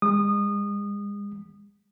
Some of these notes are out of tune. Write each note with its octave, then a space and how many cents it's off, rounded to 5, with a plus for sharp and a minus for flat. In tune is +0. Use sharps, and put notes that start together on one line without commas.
G#3 -40 D#6 -25